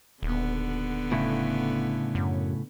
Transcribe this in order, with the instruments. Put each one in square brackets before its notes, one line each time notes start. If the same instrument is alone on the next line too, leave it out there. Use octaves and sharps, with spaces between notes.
[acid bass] D#1 [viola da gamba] D3 B3
[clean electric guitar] A2 C#3 E4
[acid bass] F#2